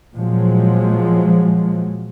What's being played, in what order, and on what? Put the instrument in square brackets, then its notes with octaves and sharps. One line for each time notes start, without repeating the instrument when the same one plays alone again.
[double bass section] A#2 F3 F#3 G#3